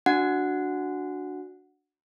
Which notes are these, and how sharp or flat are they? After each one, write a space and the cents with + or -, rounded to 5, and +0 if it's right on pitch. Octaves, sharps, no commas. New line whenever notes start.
D4 +0 F#4 -10 F#5 -5